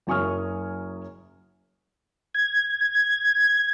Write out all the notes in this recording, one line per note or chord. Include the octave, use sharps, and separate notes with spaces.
F#1 F#3 G#5 C#6 D#6 F6
G#6